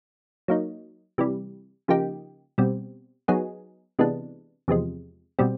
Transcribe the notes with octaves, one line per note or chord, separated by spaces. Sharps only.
F#3 A#3 D#4
C3 E3 G3
C#3 F3 A#3 D#4 G4
B2 G3 C4
F#3 B3 D#4 G#4
C3 E3 G#3 B3 D4
E2 C3 F3 G#3
B2 G3 C4